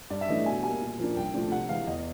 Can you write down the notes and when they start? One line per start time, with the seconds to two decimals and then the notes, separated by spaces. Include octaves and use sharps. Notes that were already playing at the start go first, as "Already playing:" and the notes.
0.10 G2 D5
0.21 E5
0.28 E3 A3 D4 D#5
0.46 B2 G#5
0.63 G3 A#3 G#5
0.82 A#2
0.99 F3 A#3 D4
1.16 C2 G5
1.34 A#2 F3 A3 D4
1.51 C3 F#5
1.69 E3 G#3 F5
1.87 E2 D#5